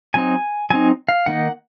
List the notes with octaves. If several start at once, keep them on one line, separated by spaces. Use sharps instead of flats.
F#3 C4 D#4 G#5
F#3 C4 D#4 G#5
F5
D#3 A#3 D#4 F#5